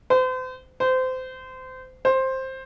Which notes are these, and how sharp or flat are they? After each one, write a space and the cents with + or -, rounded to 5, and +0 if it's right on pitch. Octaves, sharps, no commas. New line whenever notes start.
C5 -40
C5 -25
C5 +10